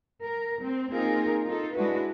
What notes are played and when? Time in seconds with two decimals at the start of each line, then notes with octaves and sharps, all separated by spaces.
0.23 A#4
0.62 C4
0.92 A#3 C4 D#4 F4 G#4 A#4
1.45 D#4 F4 A4
1.74 G#3 D4 E4 F#4 B4